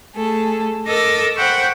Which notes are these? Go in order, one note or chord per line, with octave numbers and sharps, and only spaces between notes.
A3 G#4 A4
A4 A#4 D#5 D6 E6
C5 F#5 G5 B5 C#6